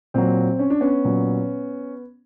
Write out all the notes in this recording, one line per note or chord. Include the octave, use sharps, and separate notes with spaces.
A#2 F#3 C4
C#4
D4
B3 C#4
A#2 F#3